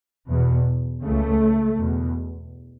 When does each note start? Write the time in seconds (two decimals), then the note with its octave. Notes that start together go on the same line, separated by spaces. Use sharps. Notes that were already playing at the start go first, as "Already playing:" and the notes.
0.29 E2 B2
1.03 C#2 C#3 A3
1.79 E2 B2